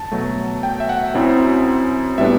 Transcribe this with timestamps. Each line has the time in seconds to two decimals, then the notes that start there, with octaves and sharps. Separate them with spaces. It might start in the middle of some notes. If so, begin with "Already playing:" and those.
Already playing: A5
0.12 B2 F#3 A3
0.63 G5
0.80 E5
0.89 F#5
1.14 F#2 F#3 C4 E4
2.18 A2 G3 B3 D4 E5